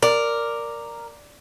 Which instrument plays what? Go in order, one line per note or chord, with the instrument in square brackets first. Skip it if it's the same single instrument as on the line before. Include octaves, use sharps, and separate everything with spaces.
[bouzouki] A#4 [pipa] D5